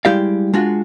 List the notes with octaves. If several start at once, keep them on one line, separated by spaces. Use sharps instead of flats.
G3 G#3 E4 G4 D5 F5
G#3 D4 F4 F#4